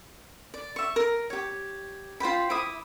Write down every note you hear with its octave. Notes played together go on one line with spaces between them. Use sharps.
D5
E5 C#6
A#4
G4 C#5
F4 C5 G5 B5
E4 B5 D6 D#6